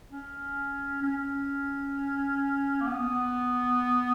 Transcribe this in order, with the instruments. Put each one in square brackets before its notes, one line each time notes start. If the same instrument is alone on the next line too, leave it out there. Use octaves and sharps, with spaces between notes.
[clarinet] C#4
C#4
A#3
B3